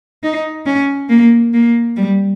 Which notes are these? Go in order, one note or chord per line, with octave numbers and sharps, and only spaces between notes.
D#4
C#4
A#3
A#3
G3